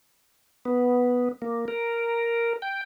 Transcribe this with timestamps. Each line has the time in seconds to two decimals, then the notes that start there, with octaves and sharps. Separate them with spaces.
0.65 B3
1.42 A#3
1.68 A#4
2.62 G5